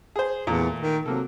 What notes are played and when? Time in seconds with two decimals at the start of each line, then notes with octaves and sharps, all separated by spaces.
0.16 G#4 C5
0.47 E2 A#2 A3 A#5
0.80 D#3
1.06 C3 F#3 A#3 A4